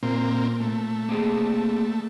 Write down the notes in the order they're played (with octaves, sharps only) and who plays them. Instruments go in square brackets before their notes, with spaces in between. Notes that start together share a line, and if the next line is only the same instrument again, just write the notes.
[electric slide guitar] A#2 [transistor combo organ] A#3 C4
[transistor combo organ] A3
[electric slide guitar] A#3 C4 G#4